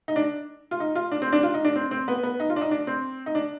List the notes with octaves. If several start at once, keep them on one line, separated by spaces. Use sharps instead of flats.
D#4
D4
F4
D#4
F4
D4
C4
D4
F4
D#4
D4
C4
C4
B3
B3
D#4
F4
D4
D#4
D4
C4
D#4
D4